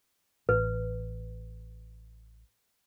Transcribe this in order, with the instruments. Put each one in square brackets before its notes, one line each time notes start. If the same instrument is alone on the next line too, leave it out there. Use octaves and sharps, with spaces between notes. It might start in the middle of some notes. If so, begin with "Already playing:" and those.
[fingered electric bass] A1 [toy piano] B4